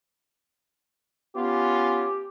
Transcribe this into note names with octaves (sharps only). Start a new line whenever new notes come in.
B3 C#4 F4 G4